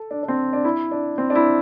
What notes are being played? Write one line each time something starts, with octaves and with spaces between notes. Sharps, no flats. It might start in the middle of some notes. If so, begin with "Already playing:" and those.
Already playing: A4
D4
D4
C4
D4
E4
D4
C4
D4
E4